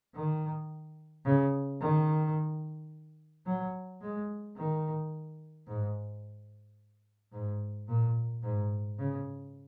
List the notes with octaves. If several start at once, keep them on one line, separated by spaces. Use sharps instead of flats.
D#3
C#3
D#3
F#3
G#3
D#3
G#2
G#2
A#2
G#2
C#3